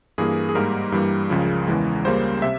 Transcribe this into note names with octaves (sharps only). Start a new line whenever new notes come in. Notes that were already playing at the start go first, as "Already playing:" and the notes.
G2 E3 A#3 G#4
G#4
G#2 G3 A#3 A#4
G2 E3 G3 A#3
C#2 C#3 F3
E2 C#3 E3 G#3
C#2 C#3 G3 A#3 C5
C3 E5